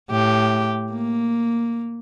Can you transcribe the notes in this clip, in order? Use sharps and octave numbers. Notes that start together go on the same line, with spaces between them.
A2 G4
A#3